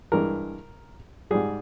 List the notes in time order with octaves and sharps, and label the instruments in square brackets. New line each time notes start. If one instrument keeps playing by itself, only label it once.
[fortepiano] G2 E3 G#3 A#4
G#2 G3 G#4